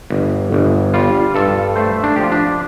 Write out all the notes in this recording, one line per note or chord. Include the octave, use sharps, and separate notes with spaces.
G1
G1
G3 F4
G2 A4
A3 C5
D4
F3 G4
F4
D4